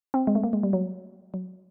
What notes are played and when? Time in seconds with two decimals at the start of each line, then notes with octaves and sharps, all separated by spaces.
0.14 C4
0.27 G#3
0.35 A3
0.43 A#3
0.53 G#3
0.63 G3
0.73 F#3
1.34 F#3